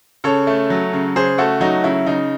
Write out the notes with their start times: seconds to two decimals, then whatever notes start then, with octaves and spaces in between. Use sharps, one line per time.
0.24 C#3 A4 C#5
0.47 A3
0.70 F#3
0.93 C#3
1.16 C#3 G#4 C5
1.38 A3 F#4 A4
1.61 F#3 D#4 F#4
1.84 C#3 E4
2.06 C#3 D#4